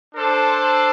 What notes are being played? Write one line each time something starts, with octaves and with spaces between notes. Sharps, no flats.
D4 A4 C5